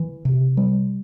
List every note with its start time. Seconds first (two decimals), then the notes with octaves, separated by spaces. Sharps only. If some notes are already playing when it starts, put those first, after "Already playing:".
Already playing: E3
0.25 C3
0.57 G3